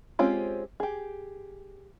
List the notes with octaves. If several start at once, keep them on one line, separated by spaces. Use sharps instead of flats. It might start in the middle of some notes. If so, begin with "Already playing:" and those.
G#3 C4 C#4 F4 G4
G4 G#4